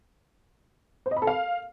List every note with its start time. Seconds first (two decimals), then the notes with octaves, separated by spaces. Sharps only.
1.06 C5
1.11 D#5
1.17 B5
1.22 A4
1.27 F5